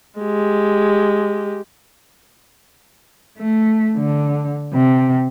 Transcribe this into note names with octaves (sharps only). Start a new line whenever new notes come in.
G#3 G4
A3
D3
C3